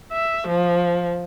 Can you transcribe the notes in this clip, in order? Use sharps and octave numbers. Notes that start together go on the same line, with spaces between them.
E5
F3